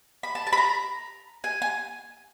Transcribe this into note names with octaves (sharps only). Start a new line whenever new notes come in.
B5
A5
A5
B5
A#5
G#5
G#5